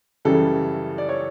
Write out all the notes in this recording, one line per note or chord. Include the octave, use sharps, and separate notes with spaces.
F#2 C#3 E3 G3 A4
D5
C#5